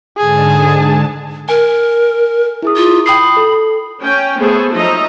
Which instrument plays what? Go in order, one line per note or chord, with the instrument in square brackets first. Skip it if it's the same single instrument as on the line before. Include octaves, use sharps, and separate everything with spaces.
[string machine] G#2 D3 A5 [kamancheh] G#4
[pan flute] A#4 [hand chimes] G#5
[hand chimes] E4 G#4 D#6
[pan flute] F4
[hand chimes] G5 D#6 C7 [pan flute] B5
[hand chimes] A4
[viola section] C#4 G5
A3 B3 G#4 A4 C5
F3 F#3 D#4 D#5 E5 A#5